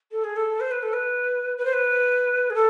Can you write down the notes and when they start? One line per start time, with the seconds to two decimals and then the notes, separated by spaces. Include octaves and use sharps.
0.12 A4
0.24 G#4
0.36 A4
0.60 C5
0.71 B4
0.83 A4
0.93 B4
1.58 B4
1.65 C5
1.73 B4
2.50 G#4
2.55 A4